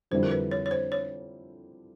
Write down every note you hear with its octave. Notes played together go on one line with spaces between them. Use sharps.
F2 D3 G3 C4 E4 C5
A#4
B4
C#5
C#5
C5
C#5